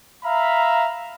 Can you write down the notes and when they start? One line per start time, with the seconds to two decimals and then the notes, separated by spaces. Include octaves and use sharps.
0.24 E5 F5 A#5 B5